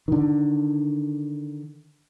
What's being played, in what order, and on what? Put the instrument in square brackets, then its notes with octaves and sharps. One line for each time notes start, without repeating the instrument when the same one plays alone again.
[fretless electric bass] D3 D#3